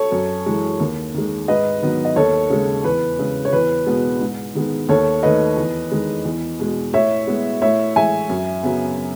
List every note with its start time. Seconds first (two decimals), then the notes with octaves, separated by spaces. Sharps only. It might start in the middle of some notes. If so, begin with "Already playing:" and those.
Already playing: A4 C#5
0.12 F#2
0.46 E3 G#3
0.80 D#2
1.14 D#3 G#3
1.48 G#2 B4 D#5
1.82 D#3 F#3 B3
2.05 D#5
2.16 D#2 A4 C#5
2.50 C#3 G#3
2.84 E2 B4
3.19 C#3 G#3
3.45 C#5
3.53 E2 B4
3.86 B2 G#3 B3
4.21 G#2
4.55 D#3 G#3 B3
4.89 D#2 A4 C#5
5.23 D#3 A3 B4 D#5
5.57 E2
5.91 D#3 G#3
6.25 E2
6.59 B2 G#3
6.93 A2 C#5 E5
7.27 G#3 B3
7.62 A2 C#5 E5
7.96 E3 G#3 E5 G#5
8.29 F#2
8.63 C#3 F#3 B3